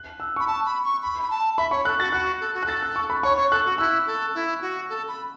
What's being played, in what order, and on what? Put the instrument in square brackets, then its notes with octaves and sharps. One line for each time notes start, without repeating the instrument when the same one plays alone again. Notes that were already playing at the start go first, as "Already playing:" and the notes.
Already playing: [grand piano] F#6
E6
[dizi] B5 [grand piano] C#6
[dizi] A5 [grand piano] E6
[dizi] B5
C#6
B5
B5
A5
[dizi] E5 [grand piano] B5
[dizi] C#5 [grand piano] C#6
[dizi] A4 [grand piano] F#6
[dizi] F#4 [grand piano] A6
[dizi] F#4 [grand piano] F#6
[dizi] A4
F#4
[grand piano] F#6
[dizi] A4 [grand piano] A6
[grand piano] F#6
C#6
B5
[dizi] C#5 [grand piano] C#6
[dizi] C#5
[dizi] A4 [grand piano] F#6
[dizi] F#4
[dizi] E4 [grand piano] E6
[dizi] A4
E4
F#4
A4
B5